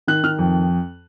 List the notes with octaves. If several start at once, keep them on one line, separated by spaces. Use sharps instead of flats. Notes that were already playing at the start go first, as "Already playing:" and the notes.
D#3 F#6
D#3 F6
F2